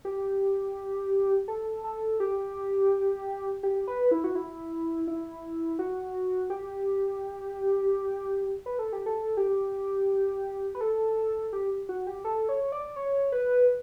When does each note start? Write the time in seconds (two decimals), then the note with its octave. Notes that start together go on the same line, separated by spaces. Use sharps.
0.05 G4
1.48 A4
1.84 A4
2.20 G4
3.63 G4
3.88 B4
4.11 E4
4.24 F#4
4.35 E4
5.07 E4
5.79 F#4
6.50 G4
8.66 B4
8.79 A4
8.93 G4
9.06 A4
9.37 G4
10.75 B4
10.81 A4
11.53 G4
11.89 F#4
12.07 G4
12.25 A4
12.49 C#5
12.72 D5
12.96 C#5
13.32 B4